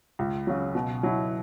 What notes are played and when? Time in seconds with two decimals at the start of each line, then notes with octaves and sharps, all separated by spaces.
0.19 C#2
0.47 C#3 F#3
0.75 B2
1.03 F#3 E4